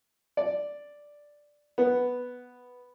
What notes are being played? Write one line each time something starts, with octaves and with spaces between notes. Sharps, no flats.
D5
B3